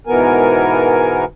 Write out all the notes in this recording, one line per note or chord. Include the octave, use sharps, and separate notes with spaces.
G#2 B2 E3 B3 A#4 G#5